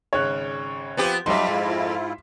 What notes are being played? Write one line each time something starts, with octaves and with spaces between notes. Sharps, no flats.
G#1 C#3 C#5 F#6
F3 B3 C4 G4
F2 F#3 G3 A3 D#4 E5 C6
G#2 G#3 E4 F4